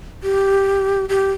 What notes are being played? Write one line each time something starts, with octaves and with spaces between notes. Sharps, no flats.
G4
G4